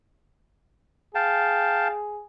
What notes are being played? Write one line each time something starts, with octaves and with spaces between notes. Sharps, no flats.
G#4 F5 G5 A5